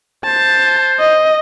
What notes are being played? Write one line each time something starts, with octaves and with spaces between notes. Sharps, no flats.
C5 A5
D#5